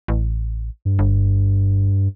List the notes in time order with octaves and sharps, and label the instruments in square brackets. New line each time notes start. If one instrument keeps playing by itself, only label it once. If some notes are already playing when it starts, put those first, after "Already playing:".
[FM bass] A1
[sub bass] G2
[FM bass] G1